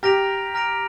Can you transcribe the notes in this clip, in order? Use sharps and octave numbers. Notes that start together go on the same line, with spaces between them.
G4 A#5 F6 A#6 D7 F7
A#5 F6 A#6 D7 F7